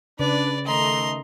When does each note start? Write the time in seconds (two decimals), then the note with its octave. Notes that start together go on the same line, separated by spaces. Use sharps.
0.19 C#3 D4 B4 D5
0.67 D#3 A3 D#5 A#5 C6